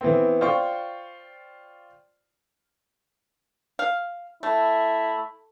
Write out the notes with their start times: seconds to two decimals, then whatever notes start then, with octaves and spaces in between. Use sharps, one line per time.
0.01 E3 B3 C4
0.41 F4 C5 D5 G5 C#6
3.79 F5
4.43 A3 E4